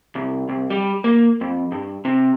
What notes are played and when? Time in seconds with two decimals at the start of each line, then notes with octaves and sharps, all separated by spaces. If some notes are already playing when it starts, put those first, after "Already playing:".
0.15 C2
0.49 C2
0.70 G3
1.04 A#3
1.41 F2
1.72 G2
2.05 C3